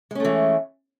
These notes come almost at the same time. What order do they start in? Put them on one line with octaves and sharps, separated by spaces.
G#3 C#4 A3 E3